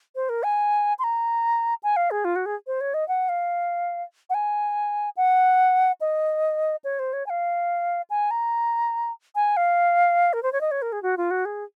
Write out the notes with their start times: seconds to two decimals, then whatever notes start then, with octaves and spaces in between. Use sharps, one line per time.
0.15 C5
0.29 A#4
0.43 G#5
0.99 C6
1.04 A#5
1.83 G#5
1.96 F5
2.11 G#4
2.25 F4
2.36 F#4
2.46 G#4
2.67 C5
2.81 C#5
2.94 D#5
3.08 F#5
3.29 F5
4.30 F#5
4.34 G#5
5.17 F#5
6.01 D#5
6.84 C#5
6.99 C5
7.13 C#5
7.26 G#5
7.30 F5
8.10 G#5
8.31 A#5
9.35 G#5
9.57 F5
10.33 A#4
10.43 C5
10.52 C#5
10.61 D#5
10.71 C#5
10.82 A#4
10.92 G#4
11.03 F#4
11.17 F4
11.31 F#4
11.45 G#4